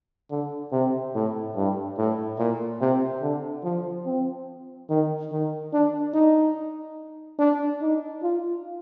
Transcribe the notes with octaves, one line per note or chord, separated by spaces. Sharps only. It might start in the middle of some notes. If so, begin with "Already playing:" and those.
D3
C3
A2
G2
A2
A#2
C3
D3
F3
C4
D#3
D#3
D4
D#4
D4
D#4
F4